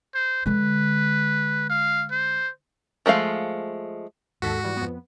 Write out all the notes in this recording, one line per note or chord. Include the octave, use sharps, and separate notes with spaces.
C5
D3 G#3 B4
F5
C5
F3 G#3 A3 F5
D#2 G#2 F#4 A4 B6
E3 G3
F2 B3